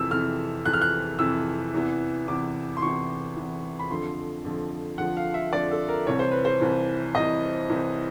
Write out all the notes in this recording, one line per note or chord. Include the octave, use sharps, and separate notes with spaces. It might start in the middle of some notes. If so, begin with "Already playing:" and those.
Already playing: F2 C3 E3 E6
F2 C3 E3 F6
F2 C3 E3 F#6
F6
F#6
F2 C3 E3 E6
E2 C3 E3
E2 C3 E3 D6
C6
E2 C3 E3 C#6
E2 C3 E3
B5
F2 D3 F3 C6
F2 D3 F3
F2 D3 F3 F#5
F5
E5
F2 D3 F3 D5
A4
A#4
C2 C3 E3 C#5
C5
B4
C5
C2 C3 E3
C2 C3 E3 D#5
C2 C3 E3